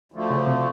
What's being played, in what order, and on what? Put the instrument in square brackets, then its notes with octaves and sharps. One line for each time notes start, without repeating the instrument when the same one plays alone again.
[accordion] D2 D3 F3 A3
[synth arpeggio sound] C#3
C3